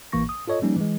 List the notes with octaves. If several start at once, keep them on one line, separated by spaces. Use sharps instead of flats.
A1 E3 A#3 C#6 A#6
D#6
F4 A4 C#5 D#5
F3 G3 A#3 C#4 D#4
E3 G#3